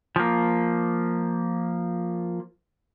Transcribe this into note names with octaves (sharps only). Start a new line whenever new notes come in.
F3 A#3